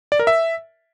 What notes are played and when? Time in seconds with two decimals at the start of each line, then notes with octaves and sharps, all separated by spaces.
0.12 D5
0.19 A#4
0.27 E5